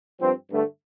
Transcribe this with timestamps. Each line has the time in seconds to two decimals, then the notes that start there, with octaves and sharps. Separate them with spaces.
0.20 G2 F3 C4
0.50 G2 D3 A3